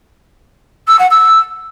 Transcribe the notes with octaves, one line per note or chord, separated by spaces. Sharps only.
E6
F#5
E6